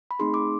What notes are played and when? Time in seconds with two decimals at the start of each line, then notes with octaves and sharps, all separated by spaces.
0.11 B5
0.19 A3 C4 D#4 G#4 C6
0.34 D6